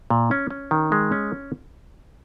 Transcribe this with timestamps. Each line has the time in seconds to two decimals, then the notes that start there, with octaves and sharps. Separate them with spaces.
0.10 A#2
0.31 C#4
0.50 C#4
0.71 D#3
0.92 G#3
1.12 C#4